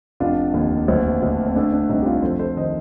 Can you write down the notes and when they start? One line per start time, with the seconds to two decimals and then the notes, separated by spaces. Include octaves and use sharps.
0.20 F1 D4 F4
0.54 D#2
0.88 D2
1.22 D2
1.47 C4
1.56 A3 D4
1.72 D4
1.89 C2 C4 D#4
2.02 G4
2.06 D4 F4
2.22 F2 A4 C5
2.39 A4 C5
2.57 D#3 C5 D#5